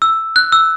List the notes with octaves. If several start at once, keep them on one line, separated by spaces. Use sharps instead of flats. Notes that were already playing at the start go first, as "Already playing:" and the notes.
E6
F#6
E6